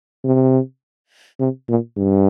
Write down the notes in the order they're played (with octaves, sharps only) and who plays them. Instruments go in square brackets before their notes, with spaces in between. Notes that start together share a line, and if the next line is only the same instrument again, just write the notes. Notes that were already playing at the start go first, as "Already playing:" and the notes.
[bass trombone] C3
C3
A#2
G2